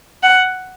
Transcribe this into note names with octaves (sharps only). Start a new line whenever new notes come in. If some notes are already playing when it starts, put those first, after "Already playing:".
F#5